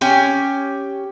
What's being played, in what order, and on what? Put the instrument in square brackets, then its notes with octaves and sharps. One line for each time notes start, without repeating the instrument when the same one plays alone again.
[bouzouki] C#4 G4 G5 G#5